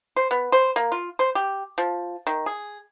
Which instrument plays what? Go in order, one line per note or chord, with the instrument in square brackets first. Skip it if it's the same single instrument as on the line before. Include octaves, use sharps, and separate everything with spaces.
[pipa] C5
B3
C5
A#3
F4
C5
G4
F3
D#3
G#4